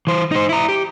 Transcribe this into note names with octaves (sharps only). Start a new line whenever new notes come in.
E3 C5
D#4 C5
E4 A#5
G4